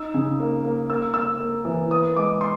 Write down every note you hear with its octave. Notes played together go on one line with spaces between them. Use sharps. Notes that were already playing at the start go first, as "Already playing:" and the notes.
Already playing: D#4 E6
C#3
A#3
A#3
A#3 E6
A#3 E6
A#3
E3
B3 D#6
G#3 D6
C6